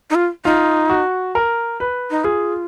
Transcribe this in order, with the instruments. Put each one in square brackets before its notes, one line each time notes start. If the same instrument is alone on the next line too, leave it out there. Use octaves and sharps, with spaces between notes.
[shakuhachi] D#4
F4
[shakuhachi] D#4 [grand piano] F4
[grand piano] F#4
A#4
B4
[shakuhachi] D#4
[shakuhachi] F4 [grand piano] G#4